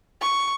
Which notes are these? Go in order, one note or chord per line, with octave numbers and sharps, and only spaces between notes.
C#6